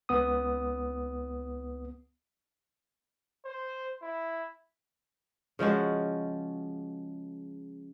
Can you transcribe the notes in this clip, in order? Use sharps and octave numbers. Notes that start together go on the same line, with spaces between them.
C#2 B3 D#6
C5
E4
C#3 F3 G#3 F#4